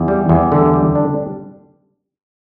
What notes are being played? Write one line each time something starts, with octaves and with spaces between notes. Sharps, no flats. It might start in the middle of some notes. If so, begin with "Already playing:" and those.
Already playing: E2
G3
E2
D3
G3
D4